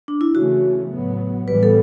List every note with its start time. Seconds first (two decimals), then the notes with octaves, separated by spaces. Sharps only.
0.08 D4
0.21 E4
0.35 C#3 E3 A3 C#4 F#4
0.92 A2 F#3 B3
1.48 A2 E3 G3 B3 B4
1.63 A4